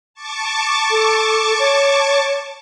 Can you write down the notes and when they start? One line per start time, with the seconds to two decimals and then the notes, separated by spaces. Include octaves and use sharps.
0.14 A5 C#6 D6
0.90 A4
1.59 C#5